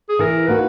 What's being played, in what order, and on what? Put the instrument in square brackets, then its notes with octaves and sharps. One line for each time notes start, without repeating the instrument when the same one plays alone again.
[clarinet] G#4
[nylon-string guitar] E3 [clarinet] A#4
[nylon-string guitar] A#3 D#4 F#4 [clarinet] B4